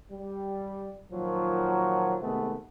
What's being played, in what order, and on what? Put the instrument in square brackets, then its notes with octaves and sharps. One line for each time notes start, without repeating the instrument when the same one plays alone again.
[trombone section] G3
A#2 D#3 F3 F#3
C3 D#3 G#3 A3 B3